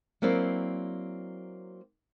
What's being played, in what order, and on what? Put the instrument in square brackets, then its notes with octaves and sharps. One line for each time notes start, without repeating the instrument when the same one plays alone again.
[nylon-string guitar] F#3 A#3 C4 E4 D5